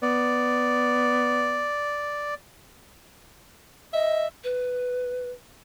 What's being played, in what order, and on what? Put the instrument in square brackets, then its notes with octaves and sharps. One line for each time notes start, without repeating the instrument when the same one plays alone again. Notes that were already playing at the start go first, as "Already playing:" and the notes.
[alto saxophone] B3 [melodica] D5
[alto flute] D#5 [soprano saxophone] E5
[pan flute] B4